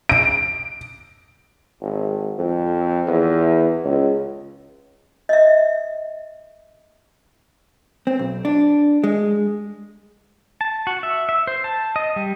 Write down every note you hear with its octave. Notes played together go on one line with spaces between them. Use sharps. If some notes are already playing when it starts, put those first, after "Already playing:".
D7
G#1
F2
E2
C#2
D#5 E5
C4
B1
D4
G#3
A5
F#4
E5
E5
C5
A5
D#5
G3